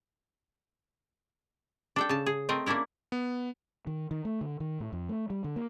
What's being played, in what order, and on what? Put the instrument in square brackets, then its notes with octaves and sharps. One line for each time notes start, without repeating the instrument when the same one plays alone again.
[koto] D4 A4 G5
C#3 A5
G#4
A3 C4 A#4 D#5
A#3 C#4 D4 E4 A#4
[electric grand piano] B3
[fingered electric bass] D#3
D#3
A3
D3
D#3
A2
F2
A3
G3
D3
A#3